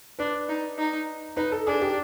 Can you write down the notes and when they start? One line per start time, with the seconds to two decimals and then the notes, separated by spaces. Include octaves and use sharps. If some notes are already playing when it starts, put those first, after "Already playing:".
0.19 D4 B4
0.49 D#4
0.78 D#4
1.37 D#4 B4
1.52 A4
1.67 D4 G#4
1.81 G4